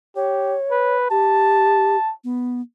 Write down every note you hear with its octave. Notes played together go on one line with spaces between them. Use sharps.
G4 C#5
B4
G4 A5
B3